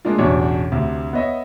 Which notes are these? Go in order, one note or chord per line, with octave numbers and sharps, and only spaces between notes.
G#3 A#3 D4 F4
A1 E2 B2 G3 D4 C#5
D2 C3
B3 C#5 D#5 E5